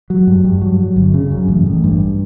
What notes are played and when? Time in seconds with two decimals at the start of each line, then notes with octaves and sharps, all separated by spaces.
0.10 F#3
0.27 G2
0.44 G2
0.61 F#3
0.80 F#3
0.96 G1
1.14 C#3
1.31 F#2
1.48 A1
1.66 A1
1.84 G2